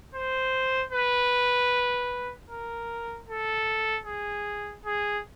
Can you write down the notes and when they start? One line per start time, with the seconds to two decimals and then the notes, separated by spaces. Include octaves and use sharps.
0.14 C5
0.92 B4
2.50 A#4
3.29 A4
4.06 G#4
4.85 G#4